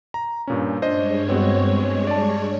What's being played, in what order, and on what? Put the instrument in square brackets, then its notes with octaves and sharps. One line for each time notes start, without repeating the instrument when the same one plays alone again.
[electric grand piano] A#5
G2 A#2 C#4
[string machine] G2 G#3 C#5 [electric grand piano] D4 C5 D#5
[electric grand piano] B3 C4 F#4
D5 A5